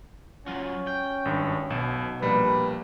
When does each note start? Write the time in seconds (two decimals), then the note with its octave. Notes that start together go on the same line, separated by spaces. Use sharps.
0.46 F#3 C#4 F4 F#4
0.87 G5
1.25 G#1 G2
1.70 B1 B2 E7
2.22 A#1 G3 A#3 B4